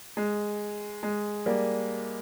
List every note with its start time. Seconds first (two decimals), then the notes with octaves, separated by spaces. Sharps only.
0.17 G#3
1.03 G#3
1.46 G3 A#3